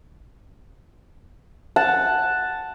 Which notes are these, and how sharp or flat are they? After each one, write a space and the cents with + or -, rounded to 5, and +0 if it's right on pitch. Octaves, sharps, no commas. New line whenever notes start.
F#5 +0 A5 +0